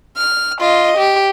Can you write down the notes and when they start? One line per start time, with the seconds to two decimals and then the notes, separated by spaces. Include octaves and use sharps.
0.17 F6
0.60 F4 D#5
0.97 G4